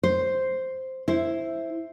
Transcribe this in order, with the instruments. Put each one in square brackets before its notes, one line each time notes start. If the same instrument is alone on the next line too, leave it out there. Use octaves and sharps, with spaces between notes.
[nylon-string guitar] C5
E4 C5